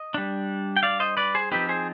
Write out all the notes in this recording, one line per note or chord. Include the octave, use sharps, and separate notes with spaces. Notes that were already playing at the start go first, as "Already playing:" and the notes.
Already playing: D#5
G3 D4
G5
D5 F5
C5 D#5
B4 D5
G#4 C5
F3 C4 D#4 G4 B4
G#4 C5